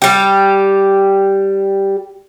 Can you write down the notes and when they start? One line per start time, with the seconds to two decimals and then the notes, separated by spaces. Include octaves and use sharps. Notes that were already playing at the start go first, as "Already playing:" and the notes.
0.02 G3 G4